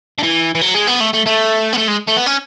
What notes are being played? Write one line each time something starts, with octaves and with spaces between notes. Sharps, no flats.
D3
E3
E3
F#3
G#3
B3
A3
A3
A3
B3
A3
G#3
A3
B3
C#4